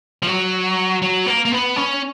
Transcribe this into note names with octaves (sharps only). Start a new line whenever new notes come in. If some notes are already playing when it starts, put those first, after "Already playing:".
F3
F#3
F#3
A#3
A#3
B3
C#4